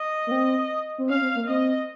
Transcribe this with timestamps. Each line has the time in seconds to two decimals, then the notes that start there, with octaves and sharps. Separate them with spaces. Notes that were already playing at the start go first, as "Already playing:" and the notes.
Already playing: D#5
0.27 A#3
0.31 C4
0.98 C4
1.10 C#4 F5
1.22 C4
1.35 A#3
1.48 C4 D#5